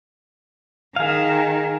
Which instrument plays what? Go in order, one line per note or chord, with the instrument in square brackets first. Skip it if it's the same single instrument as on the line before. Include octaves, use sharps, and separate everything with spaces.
[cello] D#3 [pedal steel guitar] G#4 F5